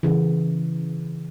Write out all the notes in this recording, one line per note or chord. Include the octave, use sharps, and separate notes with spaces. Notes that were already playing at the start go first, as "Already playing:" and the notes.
C#3 E3